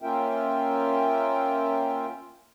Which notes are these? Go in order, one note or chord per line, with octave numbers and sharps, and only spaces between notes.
A#3 C#4 F4 A#4 E5 G5